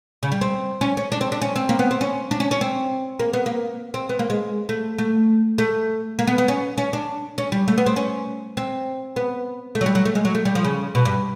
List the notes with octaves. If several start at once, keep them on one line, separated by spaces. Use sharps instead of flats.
C#3
G3
C4
C#4
C#4
D4
C4
D4
C#4
C4
A#3
B3
C4
C#4
D4
C#4
C#4
C4
A#3
B3
A#3
C4
B3
A#3
G#3
A3
A3
A3
A#3
B3
B3
C#4
C#4
D4
C#4
G3
A3
B3
C4
C#4
C4
B3
A3
F#3
G3
F#3
A3
G#3
F#3
A3
G3
F3
C#3
B2
G2